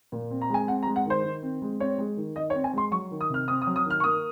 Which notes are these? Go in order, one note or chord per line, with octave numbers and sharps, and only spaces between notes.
A#2
C4
A#5
G#3 G#5
C4 F#5
A#5
G#3
F#5
D#3 C5
D#3
C4
G#3
C4 C#5
G#3
D#3
D#3 D#5
C#5
C4
G#5
G#3 C6
F#3 C#6
D#3
D#6
C3 F6
C4 D#6
D#6
F#3
D#6
D#3
F6
C#6
A#3 D#6